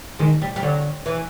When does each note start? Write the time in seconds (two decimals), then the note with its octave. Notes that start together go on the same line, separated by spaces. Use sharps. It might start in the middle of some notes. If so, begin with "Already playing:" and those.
0.19 D#3 G#3
0.42 G3
0.56 G3
0.63 D3 F#3
1.06 E3